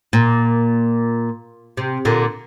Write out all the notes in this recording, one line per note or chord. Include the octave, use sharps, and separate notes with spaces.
A#2
C3
A#2 D3